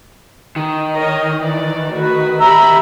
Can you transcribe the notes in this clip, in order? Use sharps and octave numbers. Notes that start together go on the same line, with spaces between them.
D#3
A#4 C#5 D#5
E3 D5
A3 F#4 B4
G4 E5 A#5 B5 E6